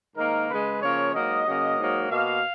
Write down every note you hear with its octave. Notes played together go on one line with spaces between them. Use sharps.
G#2 D#3 A#3 A#4
C#3 G#3 B4
C#3 F3 A#3 C#5
G#2 F#3 A#3 D#5
C#3 F#3 A#3
G#2 F#3 A#3
B2 A#3 F5